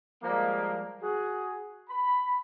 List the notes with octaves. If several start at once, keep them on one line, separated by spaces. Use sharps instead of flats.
F3 G3 G#3 A#3
F#4 G#4
B5